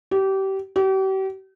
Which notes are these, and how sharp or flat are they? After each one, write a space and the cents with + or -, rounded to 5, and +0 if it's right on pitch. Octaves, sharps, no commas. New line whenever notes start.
G4 -25
G4 -40